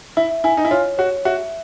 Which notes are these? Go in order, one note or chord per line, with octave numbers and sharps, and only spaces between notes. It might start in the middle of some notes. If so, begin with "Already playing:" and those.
E4 E5
E4 G#5
D#4
E4
F4 C#5
F#4 C#5
F#4 E5